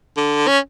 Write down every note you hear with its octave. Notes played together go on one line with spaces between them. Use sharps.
D3
C#4